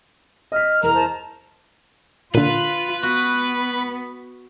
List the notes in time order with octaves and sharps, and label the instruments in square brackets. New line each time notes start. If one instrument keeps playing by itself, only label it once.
[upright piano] D#5 B6 [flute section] F6
[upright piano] E2 [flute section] A#4 [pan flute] A#5
[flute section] C5 D#5 A5
[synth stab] A#2 D3 [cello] F4 [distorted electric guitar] B4
[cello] B3 [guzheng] F#4